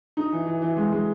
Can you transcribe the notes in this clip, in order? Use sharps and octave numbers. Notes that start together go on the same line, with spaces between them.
D#4
E3
E3
E3
G#3
G#3